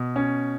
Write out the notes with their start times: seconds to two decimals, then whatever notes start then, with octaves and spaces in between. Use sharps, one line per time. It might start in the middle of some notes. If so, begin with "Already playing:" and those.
Already playing: B2
0.16 C#4